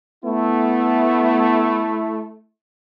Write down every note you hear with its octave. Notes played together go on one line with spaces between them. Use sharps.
A3 B3 E4